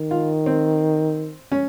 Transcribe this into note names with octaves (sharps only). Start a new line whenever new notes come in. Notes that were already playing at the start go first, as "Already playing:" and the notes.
Already playing: D#3
F4
C4
C#4